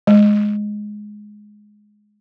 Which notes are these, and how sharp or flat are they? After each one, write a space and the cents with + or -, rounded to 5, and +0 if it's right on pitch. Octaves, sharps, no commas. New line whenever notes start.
G#3 +5